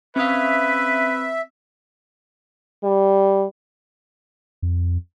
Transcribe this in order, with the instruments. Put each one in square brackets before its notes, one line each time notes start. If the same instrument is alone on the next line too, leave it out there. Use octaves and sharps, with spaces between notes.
[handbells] C4 D#6 [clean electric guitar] C#4 F5 [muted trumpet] B4 [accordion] E5
[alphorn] G3
[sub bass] F2